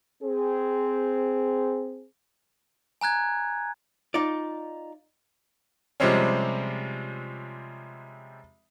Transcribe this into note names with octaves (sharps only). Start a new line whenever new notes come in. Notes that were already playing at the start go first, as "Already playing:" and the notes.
C4 G#4
G#5 A#5 F#6 G#6
D#4 F4 D5
C3 F3 G3 G#3 C4 C#4